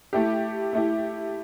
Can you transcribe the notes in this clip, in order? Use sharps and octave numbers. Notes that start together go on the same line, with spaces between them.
A3 E4 G4
A3 E4 G4